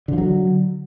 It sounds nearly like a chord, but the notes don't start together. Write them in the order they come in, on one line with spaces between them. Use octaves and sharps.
D3 F3 F#3